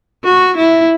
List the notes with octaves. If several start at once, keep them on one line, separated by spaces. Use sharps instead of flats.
F#4
E4